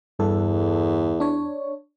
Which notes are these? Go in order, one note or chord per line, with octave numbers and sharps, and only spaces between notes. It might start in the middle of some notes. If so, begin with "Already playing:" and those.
E2 G2 A4
D4 C#5